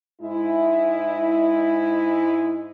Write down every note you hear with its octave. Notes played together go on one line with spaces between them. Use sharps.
G#2 G#3 E4